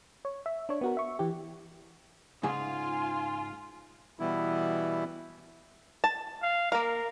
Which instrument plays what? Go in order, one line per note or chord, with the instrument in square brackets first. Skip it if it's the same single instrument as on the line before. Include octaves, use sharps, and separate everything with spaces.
[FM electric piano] C#5
E5
D4 C#5
B3 F#4 A#4
E5 C#6
E3 G4
[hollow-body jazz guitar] G#2 C#3 G#4 [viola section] F4 [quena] G#5
[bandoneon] B2 E3 G3 B3 E4
[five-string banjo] A5
[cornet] F5
[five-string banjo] A#3 F5 [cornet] A#4